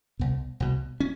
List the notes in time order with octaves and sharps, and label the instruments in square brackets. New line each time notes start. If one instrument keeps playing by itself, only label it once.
[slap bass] C2 B2
C2 B2
C#4